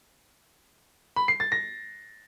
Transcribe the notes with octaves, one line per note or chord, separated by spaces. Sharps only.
B5
C7
A6
A#6